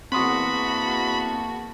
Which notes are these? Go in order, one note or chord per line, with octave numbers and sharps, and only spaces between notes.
E2 A#3 C4 F#4 A5 B5 C6 D#6